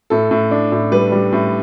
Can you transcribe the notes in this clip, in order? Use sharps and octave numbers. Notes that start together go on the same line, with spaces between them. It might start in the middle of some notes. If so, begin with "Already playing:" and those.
A2 A4
A2
D4
A2
G3 B4
G3
A2